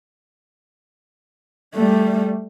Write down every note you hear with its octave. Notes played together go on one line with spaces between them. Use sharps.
G3 A3